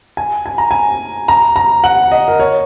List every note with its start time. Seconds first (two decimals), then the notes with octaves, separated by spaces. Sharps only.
0.17 G#5
0.46 G#5
0.58 A#5
0.71 G#5
1.28 A#5
1.56 A#5
1.84 F#5
2.11 D#5
2.28 A#4
2.40 C#5